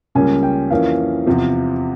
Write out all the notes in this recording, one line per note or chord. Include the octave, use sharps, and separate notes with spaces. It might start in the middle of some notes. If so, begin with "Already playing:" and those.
C#2 C#3 G3 A#3 C#4 G#5
G5
F2 E3 A#3 C#4 F5
E2 C3 F3